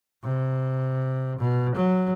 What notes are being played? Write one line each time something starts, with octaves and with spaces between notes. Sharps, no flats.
C3
B2
F#3